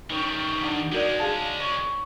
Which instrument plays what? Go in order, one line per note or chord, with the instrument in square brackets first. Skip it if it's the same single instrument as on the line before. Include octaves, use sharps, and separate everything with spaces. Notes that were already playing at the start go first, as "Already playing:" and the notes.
[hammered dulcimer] D#3 C#4 [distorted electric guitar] E3 G3
[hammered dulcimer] D4 F#5 D6
[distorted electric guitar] G#3 C#4 [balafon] F#4 A#4 D5
[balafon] G#4 F5 A5
[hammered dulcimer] C#5